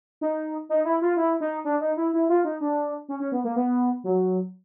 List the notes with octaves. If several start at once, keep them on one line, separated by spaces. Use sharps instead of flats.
D#4
D#4
E4
F4
E4
D#4
D4
D#4
E4
E4
F4
D#4
D4
C#4
C#4
B3
A#3
B3
F#3